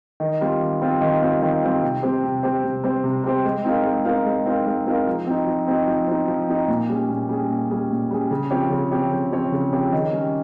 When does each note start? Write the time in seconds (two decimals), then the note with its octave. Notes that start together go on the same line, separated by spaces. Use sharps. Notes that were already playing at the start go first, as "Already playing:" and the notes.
0.20 D#3
0.41 G3 C4 F4
0.61 D#3
0.81 G3 C4 F4
1.01 D#3
1.22 G3 C4 F4
1.42 D#3
1.62 G3 C4 F4
1.83 C3
2.03 G3 C4 G4 C5
2.23 C3
2.43 G3 C4 G4 C5
2.64 C3
2.84 G3 C4 G4 C5
3.04 C3
3.24 G3 C4 G4 C5
3.44 G#3
3.65 C4 D#4 A#4 F5
3.85 G#3
4.05 C4 D#4 A#4 F5
4.25 G#3
4.46 C4 D#4 A#4 F5
4.66 G#3
4.86 C4 D#4 A#4 F5
5.07 F3
5.27 C4 D#4
5.47 F3
5.67 C4 D#4
5.88 F3
6.08 C4 D#4
6.28 F3
6.48 C4 D#4
6.68 A#2
6.89 G3 C#4 G#4
7.09 A#2
7.29 G3 C#4 G#4
7.50 A#2
7.70 G3 C#4 G#4
7.90 A#2
8.11 G3 C#4 G#4
8.31 C#3
8.50 F3 C4 G4 C#5
8.71 C#3
8.91 F3 C4 G4 C#5
9.11 C#3
9.32 F3 C4 G4 C#5
9.52 C#3
9.72 F3 C4 G4 C#5
9.92 D#3
10.13 G3 C#4